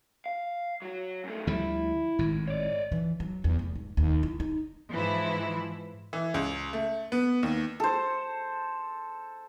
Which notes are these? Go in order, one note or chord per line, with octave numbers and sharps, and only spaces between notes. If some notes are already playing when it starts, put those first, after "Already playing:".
F5
F#3 F#4
F#2 A3
D2 F3 G3 E4
G#1 A2
C#5 D5
E3
F#3
E2
F1
G#2
D#2
E4
D#4
G#2 E3 F3 E4
E3
C#2
A3
B3
D#2
A4 C5